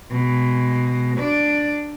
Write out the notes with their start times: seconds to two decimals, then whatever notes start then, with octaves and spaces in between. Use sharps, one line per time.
0.12 B2 G#3
1.17 D4 D5